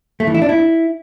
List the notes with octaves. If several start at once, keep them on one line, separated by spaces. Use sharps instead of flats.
A3
E3
E4
D4
E4